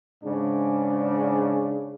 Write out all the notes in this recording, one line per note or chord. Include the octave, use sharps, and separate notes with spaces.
G#2 C#3 D4